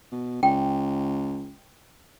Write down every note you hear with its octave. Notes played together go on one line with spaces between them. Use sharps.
B2
C#2 G5